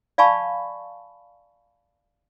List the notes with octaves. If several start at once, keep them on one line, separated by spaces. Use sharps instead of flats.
D5 F5 G#5 A5 B5 C#6